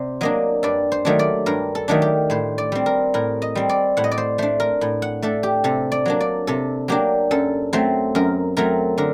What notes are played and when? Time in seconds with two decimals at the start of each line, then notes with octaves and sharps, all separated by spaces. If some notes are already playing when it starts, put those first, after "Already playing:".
Already playing: C3 C5 D5
0.21 F#3 A#3 D4 D#5
0.63 G2 D5
0.92 C5
1.05 D#3 F#3 A3 D4
1.19 D5
1.46 G2 A#4
1.75 A4
1.88 D#3 F#3 A3 D4
2.02 G4
2.30 A2 C5
2.58 D5
2.72 G3 C4
2.86 A#4
3.14 A2 A#4
3.42 D#5
3.55 G3 C4
3.69 D5
3.97 A2 F#5
4.04 D#5
4.11 D5
4.18 C5
4.38 A3 D4 C5
4.60 A#4
4.81 A2
5.02 F#5
5.22 A3 D4 A4
5.43 G4
5.64 C3 A4
5.92 D5
6.06 F#3 A#3 D4
6.20 D5
6.47 C3 A4
6.88 F#3 A#3 D4 G4
7.31 F#2 A4
7.73 F#3 A3 C4 C5
8.15 F#2 A#4
8.57 F#3 A3 C4 A#4
8.98 D3 A#4